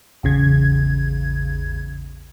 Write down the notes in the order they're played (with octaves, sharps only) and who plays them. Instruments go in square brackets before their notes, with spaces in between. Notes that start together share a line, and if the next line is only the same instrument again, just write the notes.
[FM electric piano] A1 E2 C#3 G#6